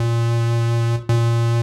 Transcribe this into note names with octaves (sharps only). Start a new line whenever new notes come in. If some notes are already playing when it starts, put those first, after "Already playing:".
Already playing: A#2
A#2